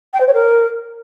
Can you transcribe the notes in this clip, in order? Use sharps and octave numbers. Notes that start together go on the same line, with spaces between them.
G5
C5
C#5
A#4